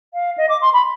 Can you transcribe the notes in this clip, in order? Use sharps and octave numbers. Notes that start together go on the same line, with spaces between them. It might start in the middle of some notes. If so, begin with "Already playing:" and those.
F5
D#5
D6
C6
B5